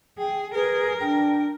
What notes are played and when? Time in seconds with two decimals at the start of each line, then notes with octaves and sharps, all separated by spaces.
0.18 G#4 G5
0.54 G#4 A#4 B4
1.00 D4 G5